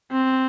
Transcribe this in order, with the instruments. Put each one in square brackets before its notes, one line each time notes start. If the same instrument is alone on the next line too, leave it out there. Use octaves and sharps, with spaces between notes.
[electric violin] C4